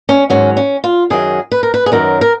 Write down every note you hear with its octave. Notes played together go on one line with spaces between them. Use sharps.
C#4
G#2 D#3 F#3 C#4
C#4
F4
F#2 D#3 F#3 G#4
B4
A#4
B4
G#4
F#2 D#3 F#3 A#4
A#4